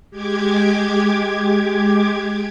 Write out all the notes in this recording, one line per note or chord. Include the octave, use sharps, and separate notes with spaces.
G#3 G4 D6 G#6